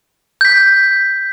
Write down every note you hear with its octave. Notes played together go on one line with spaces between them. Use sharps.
G6 B6